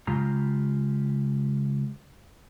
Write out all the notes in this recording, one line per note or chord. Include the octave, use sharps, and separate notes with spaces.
C#3 G#3 F4 G4 A#5